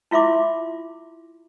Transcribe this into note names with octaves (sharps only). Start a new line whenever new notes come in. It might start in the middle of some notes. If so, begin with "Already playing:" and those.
E4 F4 E5 C6 D6